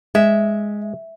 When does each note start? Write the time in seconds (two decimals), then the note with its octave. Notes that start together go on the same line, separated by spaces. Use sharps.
0.15 G#3 E5